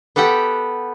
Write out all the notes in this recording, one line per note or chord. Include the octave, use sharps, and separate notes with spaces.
B3 G4 A4 F#5 G5